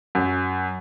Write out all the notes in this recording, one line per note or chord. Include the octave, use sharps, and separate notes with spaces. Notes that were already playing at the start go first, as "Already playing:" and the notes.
F#2